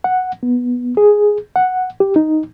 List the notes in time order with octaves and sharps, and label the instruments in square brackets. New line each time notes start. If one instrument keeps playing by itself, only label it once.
[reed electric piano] F#5
B3
G#4
F#5
G4
D#4